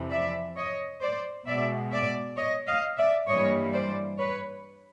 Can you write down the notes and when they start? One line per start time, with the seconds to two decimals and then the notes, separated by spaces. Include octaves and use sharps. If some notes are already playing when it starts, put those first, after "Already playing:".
Already playing: F2 C3 E3
0.11 D5 E5
0.56 C#5 D#5
1.01 C5 D5
1.46 B2 G#3 D5 E5
1.91 D5 E5
2.37 C#5 D#5
2.68 D#5 F5
2.97 D5 E5
3.27 G2 E3 G3 A#3 C#5 D#5
3.73 C5 D5
4.18 B4 C#5